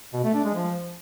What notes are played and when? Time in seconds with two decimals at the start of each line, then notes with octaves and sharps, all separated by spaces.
0.13 B2
0.24 A3
0.34 D4
0.44 G#3
0.55 F3